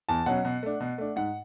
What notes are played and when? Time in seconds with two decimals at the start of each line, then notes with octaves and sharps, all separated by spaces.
0.09 E2 A5
0.26 B2 F#3 C#4 F#5
0.45 B2
0.63 A3 D4
0.81 B2
0.98 A3 D4
1.16 G#2 F#5